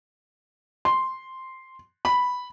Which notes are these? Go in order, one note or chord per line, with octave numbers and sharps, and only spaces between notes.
C6
B5